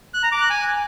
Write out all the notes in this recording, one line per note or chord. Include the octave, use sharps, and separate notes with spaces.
F#6
A#5
D6
F#6
G#5